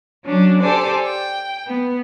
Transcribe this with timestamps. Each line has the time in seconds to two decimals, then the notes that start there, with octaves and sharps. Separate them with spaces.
0.25 F#3 C#4 D4
0.61 G4 A4 C5 D5 G#5
1.04 G5
1.67 B3